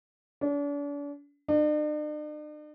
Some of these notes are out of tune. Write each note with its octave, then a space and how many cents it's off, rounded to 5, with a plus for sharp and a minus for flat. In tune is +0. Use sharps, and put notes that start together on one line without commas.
D4 -40
D4 +45